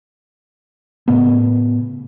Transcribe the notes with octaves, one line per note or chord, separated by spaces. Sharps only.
A2 C#3 B3